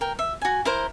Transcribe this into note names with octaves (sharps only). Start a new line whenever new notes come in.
A#4 G5
E5
F#4 G#5
E4 A#4 C5